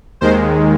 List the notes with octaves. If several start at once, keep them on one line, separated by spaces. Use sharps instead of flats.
D#2 D#3 G#3 C5